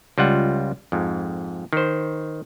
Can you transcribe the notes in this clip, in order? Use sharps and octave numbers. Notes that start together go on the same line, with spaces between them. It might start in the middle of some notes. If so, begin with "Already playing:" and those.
C#2 G3 F4 F#5
F2 G#2
D#3 C5